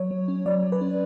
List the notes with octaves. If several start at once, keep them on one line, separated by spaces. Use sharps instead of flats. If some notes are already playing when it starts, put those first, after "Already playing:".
Already playing: F#3 C#5
F#3
C#4
F#3 D5
F#3
B4
C#4